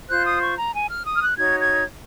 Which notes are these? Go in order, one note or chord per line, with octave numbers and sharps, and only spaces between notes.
F4 C5 F#6
D#6
C#6
A#5
G#5
F6
D#6
F6
F#6
D#4 F#4 C#5 G#6
G#6